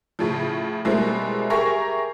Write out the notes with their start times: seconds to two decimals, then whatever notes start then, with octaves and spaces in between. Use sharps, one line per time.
0.19 A2 C#3 F3
0.85 B2 G3 G#3 C4 E4 A#4
1.50 G4 G#4 A#4 E5 A#5 C#6